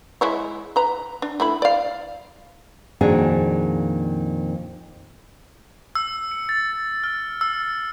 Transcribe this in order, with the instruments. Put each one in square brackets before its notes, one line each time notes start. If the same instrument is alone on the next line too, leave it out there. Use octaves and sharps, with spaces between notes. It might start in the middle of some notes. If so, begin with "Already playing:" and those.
[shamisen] G#3 E4 C#5
B4 A#5
D4
A3 E4 B5
D5 F5
[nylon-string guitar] F2 A#2 D#3 D4 F#4 G#4
[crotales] E6
C#7
A6
F6
E6